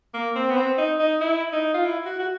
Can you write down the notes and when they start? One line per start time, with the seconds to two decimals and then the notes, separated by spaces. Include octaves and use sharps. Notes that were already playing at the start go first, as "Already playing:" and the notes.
0.14 A#3
0.35 C4
0.50 B3
0.57 C4
0.78 D#4
0.99 D#4
1.21 E4
1.53 D#4
1.74 F4
1.85 E4
2.06 F#4
2.19 F#4